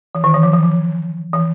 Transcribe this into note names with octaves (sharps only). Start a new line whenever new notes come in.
E3
D#3
E3
F3
E3
F3
E3